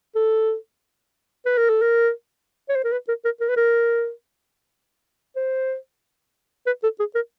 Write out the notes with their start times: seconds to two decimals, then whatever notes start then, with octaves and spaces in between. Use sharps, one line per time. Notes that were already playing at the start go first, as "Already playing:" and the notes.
0.16 A4
1.46 B4
1.58 A#4
1.69 A4
1.82 A#4
2.69 C#5
2.76 C5
2.84 A#4
2.92 B4
3.08 A#4
3.25 A#4
3.40 A#4
3.49 B4
3.57 A#4
5.36 C5
6.66 B4
6.83 A4
6.99 G#4
7.15 A#4